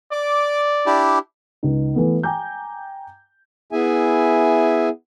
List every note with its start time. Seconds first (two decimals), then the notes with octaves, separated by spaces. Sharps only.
0.12 D5 D6
0.86 D4 E4 G4
1.63 C#2 D#4
1.95 E3 A3 B3
2.23 G5 G#5 A#5 D6 G6
3.73 B3 E4 G#4 E5 G#5